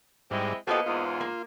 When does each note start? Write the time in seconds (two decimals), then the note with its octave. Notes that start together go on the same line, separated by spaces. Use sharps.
0.31 G#2 G3 G#3 C4 E4
0.67 F3 A#3 B3 F#4 G4 A4 D#5 F5
0.86 E2 G#2 F4
1.21 A#3